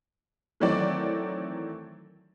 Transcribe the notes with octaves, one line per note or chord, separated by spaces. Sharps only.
D#3 E3 F#3 A3 C4 D5